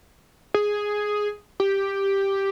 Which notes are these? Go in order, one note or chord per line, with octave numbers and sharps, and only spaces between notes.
G#4
G4